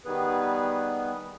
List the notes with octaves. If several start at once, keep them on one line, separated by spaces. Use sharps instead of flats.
D#3 G3 B3 G#4 B4